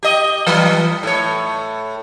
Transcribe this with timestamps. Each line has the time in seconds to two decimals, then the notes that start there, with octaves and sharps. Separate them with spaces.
0.03 G4 D#5
0.47 E3 G3 B4
1.03 A2 C#5